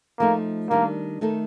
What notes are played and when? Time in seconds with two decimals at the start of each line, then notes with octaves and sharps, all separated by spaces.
0.19 F3 A3 A#3 D#4
0.70 D#3 G3 A#3 D4
1.21 D#3 A3 D#4 A4